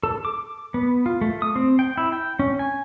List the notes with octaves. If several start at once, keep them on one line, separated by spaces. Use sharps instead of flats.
A4
D6
B3
F4
A3
D#6
C4
G5
E4
G5
C#4
G#5